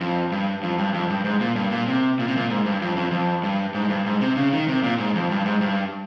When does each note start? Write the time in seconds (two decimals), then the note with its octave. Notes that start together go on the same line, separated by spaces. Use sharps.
0.01 F2
0.32 G2
0.63 F2
0.78 G2
0.94 F2
1.10 G2
1.25 G#2
1.41 A#2
1.56 G2
1.71 A#2
1.88 C3
2.19 A#2
2.28 C3
2.37 A#2
2.50 G#2
2.66 G2
2.81 F2
2.96 F2
3.12 F2
3.44 G2
3.75 G#2
3.90 G2
4.06 G#2
4.21 C3
4.37 C#3
4.53 D#3
4.68 C3
4.83 A#2
4.99 G#2
5.15 F2
5.31 G2
5.45 G#2
5.61 G2